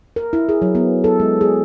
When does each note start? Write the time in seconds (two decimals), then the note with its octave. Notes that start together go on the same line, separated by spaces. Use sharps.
0.16 A#4
0.33 E4
0.49 G#4
0.62 F#3
0.75 B3
1.04 A4
1.20 G#3
1.41 G#4